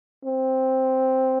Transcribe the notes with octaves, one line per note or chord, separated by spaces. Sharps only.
C4